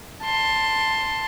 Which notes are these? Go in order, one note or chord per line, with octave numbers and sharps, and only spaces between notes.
A5 C6